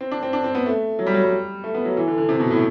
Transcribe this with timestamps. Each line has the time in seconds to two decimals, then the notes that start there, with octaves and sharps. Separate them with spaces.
0.01 C4
0.11 D4
0.23 C4
0.33 D4
0.44 C4
0.55 B3
0.66 A3
0.99 F#3
1.06 G3
1.14 F#3
1.24 G3
1.64 A3
1.75 B3
1.85 F#3
1.97 E3
2.07 D3
2.18 D3
2.29 C3
2.40 B2
2.51 A2